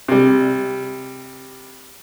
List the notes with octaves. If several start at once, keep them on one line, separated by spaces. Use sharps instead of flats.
C3 G3